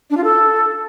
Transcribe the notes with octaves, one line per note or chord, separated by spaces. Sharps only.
D4
F4
A4